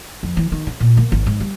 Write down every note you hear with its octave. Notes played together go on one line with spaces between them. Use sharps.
F2
E3
D#3
C#3
A#2
A#3
G#1
G#2
G3